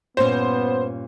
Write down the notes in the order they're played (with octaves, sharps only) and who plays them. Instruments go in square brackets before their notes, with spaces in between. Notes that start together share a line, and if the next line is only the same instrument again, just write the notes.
[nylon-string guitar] G2 A#2 C#4 [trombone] B3 [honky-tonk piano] C5